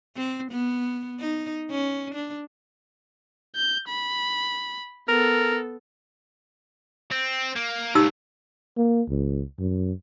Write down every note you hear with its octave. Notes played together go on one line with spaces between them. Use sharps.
C4
B3
D#4
C#4
D4
G6
B5
B3 A4 A#4
C4
A#3
C#2 A#2 D#4 G4 E6
A#3
C#2
F#2